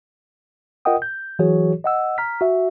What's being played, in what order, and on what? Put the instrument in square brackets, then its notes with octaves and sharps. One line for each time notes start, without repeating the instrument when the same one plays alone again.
[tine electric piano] F4 A#4 D#5 F#5 G5 D#6
G6
E3 F#3 F#4 G#4 C#5
D#5 F#5 E6
A#5 F6 B6
F#4 E5